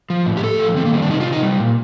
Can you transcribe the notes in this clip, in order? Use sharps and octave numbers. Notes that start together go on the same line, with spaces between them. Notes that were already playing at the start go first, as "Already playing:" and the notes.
F3
A2
G4
A2 A4
F3
D#3 C4
A#3
G3 C4
D4
C3 D#4
F4
C3
D#4
G3
A#2